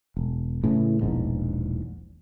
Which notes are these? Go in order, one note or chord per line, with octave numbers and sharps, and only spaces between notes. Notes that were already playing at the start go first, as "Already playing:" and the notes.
E1
A2 C#3 E3
E1 A#1 E2 G#2